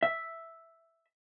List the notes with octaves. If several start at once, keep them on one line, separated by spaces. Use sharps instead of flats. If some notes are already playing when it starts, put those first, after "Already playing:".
E5